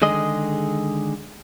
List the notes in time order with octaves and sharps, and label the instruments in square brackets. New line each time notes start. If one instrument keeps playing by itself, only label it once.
[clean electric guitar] D3 D#3 G#3 G#4 D#5